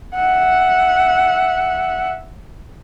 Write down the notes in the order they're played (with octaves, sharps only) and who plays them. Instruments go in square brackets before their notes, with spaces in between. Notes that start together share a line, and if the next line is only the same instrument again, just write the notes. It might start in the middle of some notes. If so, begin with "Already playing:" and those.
[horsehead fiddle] E5 F#5